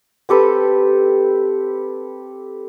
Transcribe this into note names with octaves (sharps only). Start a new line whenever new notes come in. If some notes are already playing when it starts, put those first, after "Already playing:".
C4 G4 A4 B4